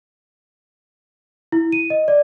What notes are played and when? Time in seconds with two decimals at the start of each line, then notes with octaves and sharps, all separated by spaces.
1.52 E4
1.72 D#7
1.90 D#5
2.08 D5